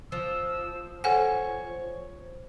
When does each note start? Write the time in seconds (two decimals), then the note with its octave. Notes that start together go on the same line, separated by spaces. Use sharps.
0.12 F3 E6
1.04 A4 C5 C#5 F#5 G#5